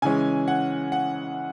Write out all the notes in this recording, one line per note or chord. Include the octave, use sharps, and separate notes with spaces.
C#3 E3 G#3 C#4 G#5
F#5
F#5